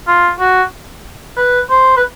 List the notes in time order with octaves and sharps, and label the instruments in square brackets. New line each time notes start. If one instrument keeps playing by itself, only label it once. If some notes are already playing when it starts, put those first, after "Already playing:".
[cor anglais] F4
F#4
B4
C5
B4